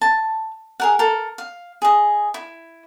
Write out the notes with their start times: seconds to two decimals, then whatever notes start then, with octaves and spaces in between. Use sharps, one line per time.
0.01 A5
0.80 G#4 A#4 F#5
0.99 A4 A#4
1.38 F5
1.82 G#4 D#5
2.34 E4